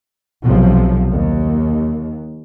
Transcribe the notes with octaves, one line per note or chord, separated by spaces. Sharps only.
B1 C3 F3
D#2